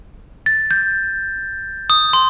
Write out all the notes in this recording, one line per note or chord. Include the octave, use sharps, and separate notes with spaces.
A6
G6
D#6
C6